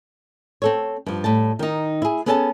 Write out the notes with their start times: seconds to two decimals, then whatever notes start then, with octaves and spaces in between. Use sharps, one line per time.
0.62 C4 A4 C#5
1.06 G2 F3
1.24 A2 G3 A5
1.59 D#3 D#4
2.02 E4 G#4
2.26 B3 C#4 G#4 A4 D#5 A5